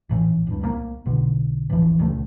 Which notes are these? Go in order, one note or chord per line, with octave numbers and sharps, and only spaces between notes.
A#1 A2 E3
D1 G2
C2 F#3 A#3
B1 B2 D3
A1 D#2 E3 F3
D#1 C#2 C3 A3